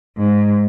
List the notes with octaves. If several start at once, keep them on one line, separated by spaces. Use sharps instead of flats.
G#2